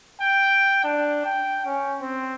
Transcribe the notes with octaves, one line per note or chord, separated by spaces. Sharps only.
G5
D4
G5
C#4
C4